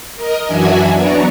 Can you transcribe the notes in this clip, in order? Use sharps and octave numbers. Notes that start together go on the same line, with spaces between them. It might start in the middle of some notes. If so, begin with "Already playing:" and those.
A#4 D#5
F#2 E3 D4 F#4 E5 G#5
F#3 B3 D4 D5 A#5 C#6